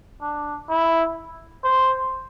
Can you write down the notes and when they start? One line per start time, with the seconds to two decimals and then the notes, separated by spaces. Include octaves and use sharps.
0.22 D4
0.70 E4
1.64 C5